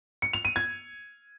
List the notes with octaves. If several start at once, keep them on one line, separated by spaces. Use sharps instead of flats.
C#7
F7
D#7
G#6